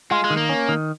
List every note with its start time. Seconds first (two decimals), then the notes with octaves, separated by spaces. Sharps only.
0.11 G#3 F4
0.24 G#3
0.30 D#3
0.37 A#3
0.49 C#4
0.69 D#3